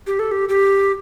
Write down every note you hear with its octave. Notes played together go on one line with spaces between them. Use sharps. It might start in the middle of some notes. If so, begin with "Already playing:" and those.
G4
A4
G4
G4